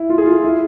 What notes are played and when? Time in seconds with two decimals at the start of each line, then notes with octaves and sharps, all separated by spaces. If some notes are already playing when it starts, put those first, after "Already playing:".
Already playing: E4
0.09 F4
0.18 G#4
0.26 F4
0.43 E4